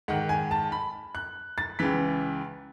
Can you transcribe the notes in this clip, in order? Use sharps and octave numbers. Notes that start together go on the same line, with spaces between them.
G#2 D#3 F#5
G#5
A5
B5
F#6
A6
C#2 C#3 E3 B6